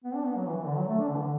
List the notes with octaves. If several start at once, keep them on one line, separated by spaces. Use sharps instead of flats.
B3
D4
B3
F#3
E3
E3
D3
F#3
A3
D4
D3
E3
D3